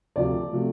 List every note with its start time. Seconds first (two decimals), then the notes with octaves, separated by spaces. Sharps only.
0.16 D2 C3 F3 A3 D5
0.53 C3 F3 A3